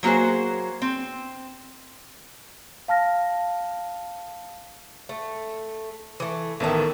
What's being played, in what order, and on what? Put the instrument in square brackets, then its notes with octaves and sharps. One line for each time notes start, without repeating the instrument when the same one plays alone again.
[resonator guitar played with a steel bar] F#3 A#3 F#4 G#4 C5
C4
[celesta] F5 A5 F6 A#6
[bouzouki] A3
E3 A3
[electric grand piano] A1 B3 A5 [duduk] D#3 [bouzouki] A3 E5